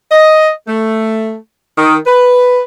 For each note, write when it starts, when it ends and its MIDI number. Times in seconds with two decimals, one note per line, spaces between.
0.11 0.49 75
0.68 1.34 57
1.78 1.96 51
2.06 2.60 71